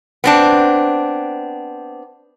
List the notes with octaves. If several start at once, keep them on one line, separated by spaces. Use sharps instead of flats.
B3 C4 D4